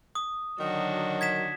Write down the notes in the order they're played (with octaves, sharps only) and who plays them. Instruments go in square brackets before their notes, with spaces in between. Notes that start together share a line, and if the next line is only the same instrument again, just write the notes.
[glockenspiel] D#6
[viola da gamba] D3 D4 F#4 [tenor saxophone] D#3 [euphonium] F#3
[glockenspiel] G#6 B6 E7